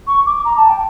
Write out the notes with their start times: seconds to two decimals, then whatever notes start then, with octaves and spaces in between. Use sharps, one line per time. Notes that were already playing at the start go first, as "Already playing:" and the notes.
0.07 C#6
0.26 D6
0.44 A#5
0.57 A5
0.69 G5